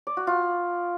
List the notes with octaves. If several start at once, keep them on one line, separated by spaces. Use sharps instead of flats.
D5
F#4
F4